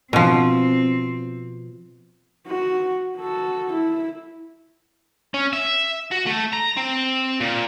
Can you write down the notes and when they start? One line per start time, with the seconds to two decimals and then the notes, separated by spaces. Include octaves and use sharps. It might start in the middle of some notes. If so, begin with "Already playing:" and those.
0.13 B2 F3 C4
2.47 F#4
3.17 F#4 A4
3.73 E4
5.34 C#4
5.53 E5
6.11 F#4
6.26 A3
6.53 A#5
6.77 C4
7.40 A#2